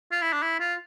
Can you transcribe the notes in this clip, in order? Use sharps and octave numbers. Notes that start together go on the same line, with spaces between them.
F4
E4
D4
E4
F4